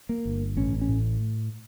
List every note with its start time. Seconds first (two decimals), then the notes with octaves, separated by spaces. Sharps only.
0.09 A#3
0.25 G1
0.57 A1 C#4
0.81 C#4
0.89 A2